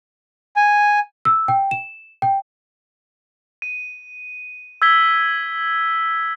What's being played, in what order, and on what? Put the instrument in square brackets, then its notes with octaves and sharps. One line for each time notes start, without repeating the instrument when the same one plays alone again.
[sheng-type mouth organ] G#5
[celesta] E6
G5
E7
G5
[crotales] D#7
E6 G#6 B6 G7